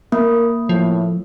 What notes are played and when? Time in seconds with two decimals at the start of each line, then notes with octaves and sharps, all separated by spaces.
0.12 A#3 A#4
0.69 A2 F3